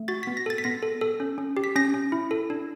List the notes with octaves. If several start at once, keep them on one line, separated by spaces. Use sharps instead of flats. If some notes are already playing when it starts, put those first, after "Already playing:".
Already playing: A3
F#4 A6
B6
B3
A#6
A4 A6
B6
B3 A#6
A4
A4
C#4
C#4
G4
B6
C#4 A#6
C#4
E4
A4
D4